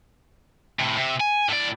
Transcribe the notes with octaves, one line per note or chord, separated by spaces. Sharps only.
A2 C3
C3
G#5
A2 D5